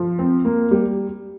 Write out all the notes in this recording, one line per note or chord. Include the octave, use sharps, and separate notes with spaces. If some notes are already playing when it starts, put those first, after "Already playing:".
Already playing: F3
C4
A#3
G3